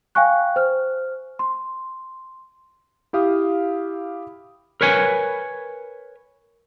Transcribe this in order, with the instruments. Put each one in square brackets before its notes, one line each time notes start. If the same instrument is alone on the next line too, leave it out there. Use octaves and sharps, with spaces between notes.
[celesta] F5 G5 G#5 C#6 F#6
C5 F6
C6
[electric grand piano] E4 G4 F5 D#6
[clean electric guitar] A#4 B4 C#5 G#5